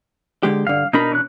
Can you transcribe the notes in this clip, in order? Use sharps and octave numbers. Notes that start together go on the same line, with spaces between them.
D3 G#3 G4
G2 D3 F5
B2 D4 D#4 A#4 A#5 B5
E3 C#4 F#6